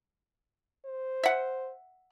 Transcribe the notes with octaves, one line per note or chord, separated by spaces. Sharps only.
C5
E5 F#5